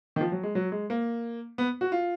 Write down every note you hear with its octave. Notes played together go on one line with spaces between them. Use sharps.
D#3
F3
F#3
G#3
F#3
G#3
A#3
B3
F#4
F4